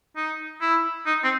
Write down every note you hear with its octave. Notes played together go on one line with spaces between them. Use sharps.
D#4
E4
D#4
C4